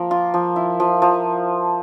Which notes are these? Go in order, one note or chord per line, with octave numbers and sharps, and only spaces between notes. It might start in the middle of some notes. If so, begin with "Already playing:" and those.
Already playing: F3 A#3 A#4
F4
F3
E4
F3
F3